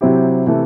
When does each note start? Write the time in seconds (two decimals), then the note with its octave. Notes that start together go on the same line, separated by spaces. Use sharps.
0.01 C3 F#3 C4 E4 G4
0.46 C3 E3 A3